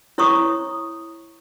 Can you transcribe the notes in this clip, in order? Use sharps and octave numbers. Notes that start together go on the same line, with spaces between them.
E4 C#5 A#5 C#6 D#6